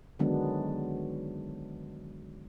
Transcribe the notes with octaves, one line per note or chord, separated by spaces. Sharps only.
D3 D#3 F#3 G#3 B3 D4